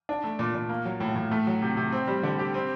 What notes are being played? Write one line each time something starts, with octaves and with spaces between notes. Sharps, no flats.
D4
A3
A#2
A#2
A#3
F#3
A2
A2
A3
F#3
C3
C3
C4
G3
D3
G4
C4